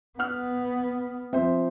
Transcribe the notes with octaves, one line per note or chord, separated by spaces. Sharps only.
B3 F#5 F6
F3 C4 C5 E5